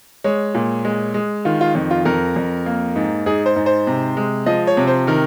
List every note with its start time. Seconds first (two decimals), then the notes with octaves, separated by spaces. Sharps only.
0.24 G#3 C#5
0.54 A#2
0.85 G#3
1.14 G#3
1.45 D#3 F4
1.61 F4
1.75 F2
1.91 F4
2.05 F2 A#4
2.36 F2
2.66 A#3
2.96 G#2
3.26 G#2 G#4
3.46 C5
3.56 G#2
3.66 C5
3.87 C3
4.17 G#3
4.46 F3 D#5
4.67 C#5
4.77 C3
4.87 C5
5.07 D#3 A#4